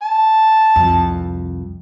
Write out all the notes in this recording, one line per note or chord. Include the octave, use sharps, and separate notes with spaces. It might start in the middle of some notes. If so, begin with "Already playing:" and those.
A5
C2 F2